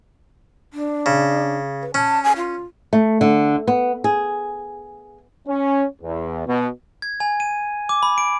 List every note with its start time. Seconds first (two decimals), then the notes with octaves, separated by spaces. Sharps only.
0.74 D4
1.06 C#3
1.82 B4
1.94 C#4 A5
2.24 G#5
2.37 F4
2.93 A3
3.21 D3
3.67 B3
4.04 G#4
5.48 C#4
6.02 E2
6.47 B2
7.02 G#6
7.20 G#5
7.40 D#7
7.89 D6
8.03 B5
8.18 D7